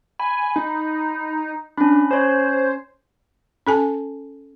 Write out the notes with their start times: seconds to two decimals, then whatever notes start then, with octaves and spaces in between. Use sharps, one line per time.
0.19 G#5 B5
0.56 D#4
1.77 C#4 D4 B5
2.11 C#4 C5 C#5
3.67 C#4 A4 G#5 A5